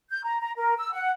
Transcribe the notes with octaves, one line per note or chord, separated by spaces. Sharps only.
G6
A#5
A#5
A#4
E6
F#5